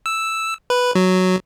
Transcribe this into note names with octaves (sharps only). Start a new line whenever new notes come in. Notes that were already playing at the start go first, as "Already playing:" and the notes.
E6
B4
F#3